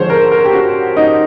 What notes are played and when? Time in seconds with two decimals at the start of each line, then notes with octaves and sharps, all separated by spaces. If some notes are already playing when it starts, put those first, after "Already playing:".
Already playing: D3 F3 G#3 C5 C#5
0.10 A#4
0.32 A#4
0.45 G4
0.53 F#4
0.97 D#4